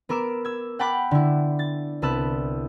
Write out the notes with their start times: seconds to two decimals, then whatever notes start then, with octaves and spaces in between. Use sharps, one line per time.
0.09 B3 A#4 D6 E6 D7 E7
0.45 E6 G#6
0.79 F#5 G5 A5 B5 D6 F#6
1.11 D3 E4
1.59 A6
2.02 C2 B3 A5 E6 F#6